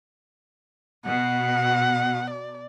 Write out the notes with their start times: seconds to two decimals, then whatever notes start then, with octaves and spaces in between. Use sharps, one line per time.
1.06 B2 F#5
2.30 D5